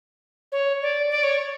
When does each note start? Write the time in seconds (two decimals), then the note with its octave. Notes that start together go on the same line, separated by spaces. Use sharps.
0.52 C#5
0.82 D5
1.10 D5
1.23 C#5